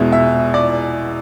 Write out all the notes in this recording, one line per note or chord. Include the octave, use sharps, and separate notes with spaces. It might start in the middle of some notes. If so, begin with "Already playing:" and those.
Already playing: E2 B2 G#3 E5
E5
D5